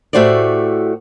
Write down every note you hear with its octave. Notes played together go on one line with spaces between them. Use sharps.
A2 A3 F#4 G4 C5 D5